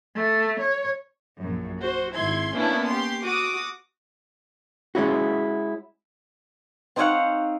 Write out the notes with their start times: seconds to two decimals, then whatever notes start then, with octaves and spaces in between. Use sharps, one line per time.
0.15 A3
0.60 C#5
1.41 A#1 F#2
1.80 F#4 C5
2.15 G#1 E4 C6 G#6
2.55 A#3 B3 C#4 D4 E4
2.89 G4 C6
3.24 F#4 D6 D#6
4.95 G#3 C#4 E4 F#4
6.96 C4 D#4 C5 C#5 F5 F#5